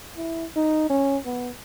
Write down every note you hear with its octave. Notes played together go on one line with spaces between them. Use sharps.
E4
D#4
C#4
B3